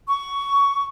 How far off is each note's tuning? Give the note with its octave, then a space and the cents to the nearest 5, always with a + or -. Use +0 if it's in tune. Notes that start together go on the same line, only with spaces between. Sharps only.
C#6 +15